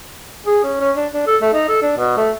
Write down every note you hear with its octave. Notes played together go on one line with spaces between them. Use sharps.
G#4
C#4
C#4
D4
D4
A4
A3
D#4
A4
D4
B2
A3